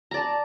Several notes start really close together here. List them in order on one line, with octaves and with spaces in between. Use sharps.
A#5 D5 A5